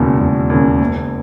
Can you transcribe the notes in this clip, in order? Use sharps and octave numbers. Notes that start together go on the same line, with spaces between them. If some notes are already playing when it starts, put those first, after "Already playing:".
Already playing: E1 D#2 C#3
E1
D#2 C#3
F#1